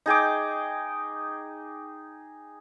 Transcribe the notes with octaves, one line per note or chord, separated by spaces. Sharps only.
D#4 G#4 G5 D6